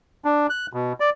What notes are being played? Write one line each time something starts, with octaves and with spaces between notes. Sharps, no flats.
D4
F#6
B2
D5